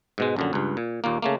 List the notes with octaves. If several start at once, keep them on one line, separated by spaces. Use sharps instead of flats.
G#2 B2 G#3
A#1 F#2 D3
C#2 G2
A#2
D#2 A#2 A#3
C#3 A3 A#3